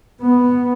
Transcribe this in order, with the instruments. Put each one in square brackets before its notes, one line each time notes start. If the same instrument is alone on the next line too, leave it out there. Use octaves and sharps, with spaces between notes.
[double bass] B3